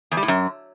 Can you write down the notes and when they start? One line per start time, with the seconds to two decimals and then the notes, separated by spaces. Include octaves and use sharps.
0.11 E2
0.17 G3
0.23 A2
0.28 F#2